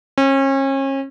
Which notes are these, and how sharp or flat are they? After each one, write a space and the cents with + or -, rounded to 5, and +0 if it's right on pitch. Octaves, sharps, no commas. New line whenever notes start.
C#4 -35